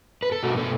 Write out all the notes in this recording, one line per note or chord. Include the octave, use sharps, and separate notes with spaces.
B4
A4
B2 A3 F#4
A4